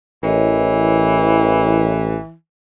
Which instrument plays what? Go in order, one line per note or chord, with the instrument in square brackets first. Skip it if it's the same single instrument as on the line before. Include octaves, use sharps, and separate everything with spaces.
[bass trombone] A1 [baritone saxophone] E3 [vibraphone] A#4 C#5 D#5